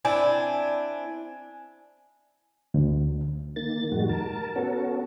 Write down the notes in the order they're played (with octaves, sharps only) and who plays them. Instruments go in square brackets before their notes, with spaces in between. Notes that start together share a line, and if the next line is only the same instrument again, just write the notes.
[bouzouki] C4 D4 E4 [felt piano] G#5
[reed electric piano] D2
[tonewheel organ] D#3 A#3 A6
F2 A2 D#3 G3 G#3 F#4
A#4 A5
B3 C#4 F#4 A4